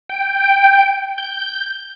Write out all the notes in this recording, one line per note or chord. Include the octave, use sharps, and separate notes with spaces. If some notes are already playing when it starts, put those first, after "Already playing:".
G5
G6